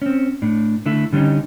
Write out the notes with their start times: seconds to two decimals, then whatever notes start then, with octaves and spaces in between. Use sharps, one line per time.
0.02 C4 C#4
0.42 A2 D4
0.86 D3 A3 E4
1.12 D3 G3 A#3 C#4 D#4